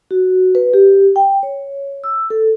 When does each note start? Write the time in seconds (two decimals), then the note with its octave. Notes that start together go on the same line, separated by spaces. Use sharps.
0.11 F#4
0.55 B4
0.74 G4
1.16 G5
1.43 C#5
2.04 E6
2.30 A4